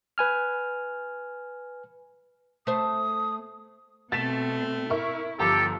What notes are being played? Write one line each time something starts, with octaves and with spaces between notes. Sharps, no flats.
B4 G#5 F6
A3 C5 D#6
B2 A3 C4 A6 B6 E7
E4 A#4 E5 C#6
G1 F3 G4 A4 A#5